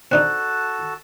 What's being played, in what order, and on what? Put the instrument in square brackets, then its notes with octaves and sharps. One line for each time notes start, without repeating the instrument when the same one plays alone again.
[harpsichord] C4 D4 D#4 [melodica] F#4 A4 A5 [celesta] F#6